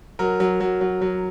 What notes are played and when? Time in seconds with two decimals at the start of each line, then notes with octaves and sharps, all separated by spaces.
0.19 F#3 A#4
0.40 F#3
0.60 F#3
0.81 F#3
1.01 F#3